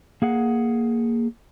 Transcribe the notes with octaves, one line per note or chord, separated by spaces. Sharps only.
A#3 G#4 F#5